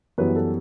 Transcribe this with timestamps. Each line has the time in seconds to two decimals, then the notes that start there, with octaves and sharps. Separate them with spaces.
0.18 F#2 E3 G3 B3 B4
0.36 A4